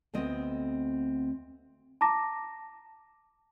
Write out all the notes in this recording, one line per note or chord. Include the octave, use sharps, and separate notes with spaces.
D2 B3 C4 D#5
A5 A#5 D6 A#6